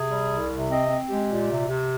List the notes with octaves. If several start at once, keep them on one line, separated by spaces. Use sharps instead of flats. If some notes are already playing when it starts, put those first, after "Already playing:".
Already playing: C3 G#4
G3
C2
C3
C4 D#5
C4
G#3 G4
A#2
C3
C3